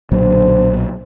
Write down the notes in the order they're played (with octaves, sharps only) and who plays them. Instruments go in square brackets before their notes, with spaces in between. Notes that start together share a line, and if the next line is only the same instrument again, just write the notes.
[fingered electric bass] B1 A#2 F#3 [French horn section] D3 C5